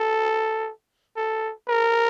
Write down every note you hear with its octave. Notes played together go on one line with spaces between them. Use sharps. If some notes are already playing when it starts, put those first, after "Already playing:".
Already playing: A4
A4
A#4